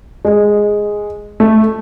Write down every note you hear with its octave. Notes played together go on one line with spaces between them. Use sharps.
G#3
A3